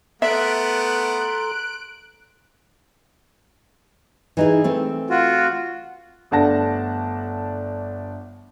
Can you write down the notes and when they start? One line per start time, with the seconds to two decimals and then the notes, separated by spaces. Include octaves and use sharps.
0.22 A3 B3 A4 E5 A#5 C6 F#6 D7
4.37 E3 D#4 G#4
4.64 A3 C4
5.10 F4 F#4
6.31 G1 A3 D4 F#5 A5 A#6